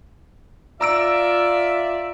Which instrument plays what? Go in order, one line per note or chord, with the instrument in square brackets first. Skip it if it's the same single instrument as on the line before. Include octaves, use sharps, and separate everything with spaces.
[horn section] F4 D5 E5 [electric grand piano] A#5 E6 D7